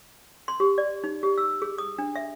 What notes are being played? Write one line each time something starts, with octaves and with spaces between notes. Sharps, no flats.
C6
G4
D5
D#4
G4
E6
G#4
D#6
D4
E5